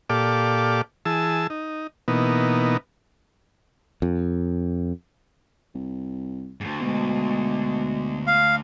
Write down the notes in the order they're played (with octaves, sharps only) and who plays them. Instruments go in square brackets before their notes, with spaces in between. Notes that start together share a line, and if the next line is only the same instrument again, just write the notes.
[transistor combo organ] A#2 G4 A4 D5 F5 D6
E3 G#4 A5 E6
D#4
B2 E3 A#3 B3 D#4
[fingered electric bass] F2
[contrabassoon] C2
[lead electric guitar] D2 G#2
[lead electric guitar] D2 [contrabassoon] B2 [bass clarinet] G#3
[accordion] F5